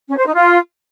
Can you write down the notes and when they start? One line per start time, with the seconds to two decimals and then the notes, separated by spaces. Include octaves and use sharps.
0.08 C#4
0.17 C5
0.26 D#4
0.34 F4